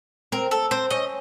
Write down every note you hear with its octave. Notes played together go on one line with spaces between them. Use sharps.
C4 A#4
A4
C4 C5
C#4 D#5